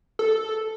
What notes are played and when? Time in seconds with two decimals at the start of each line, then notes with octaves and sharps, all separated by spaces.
0.19 A4